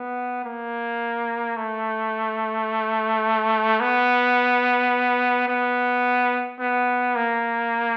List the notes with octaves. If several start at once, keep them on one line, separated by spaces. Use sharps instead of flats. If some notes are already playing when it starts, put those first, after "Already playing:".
Already playing: B3
A#3
A3
B3
B3
B3
A#3